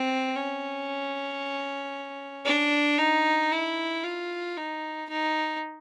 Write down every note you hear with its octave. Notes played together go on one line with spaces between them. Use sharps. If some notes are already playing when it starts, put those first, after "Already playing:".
Already playing: C4
C#4
D4
D#4
E4
F4
D#4
D#4